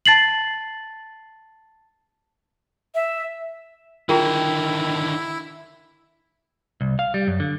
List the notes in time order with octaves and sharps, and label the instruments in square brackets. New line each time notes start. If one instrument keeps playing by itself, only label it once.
[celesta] A5 A6 C7 F#7
[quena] E5
[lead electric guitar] D3 D#3 [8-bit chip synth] E4 [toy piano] F4 G#4 A#5 [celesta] A#4 G5
[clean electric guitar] C2
F5
G3
F#2
D3